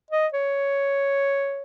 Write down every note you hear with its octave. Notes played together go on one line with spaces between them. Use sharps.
D#5
C#5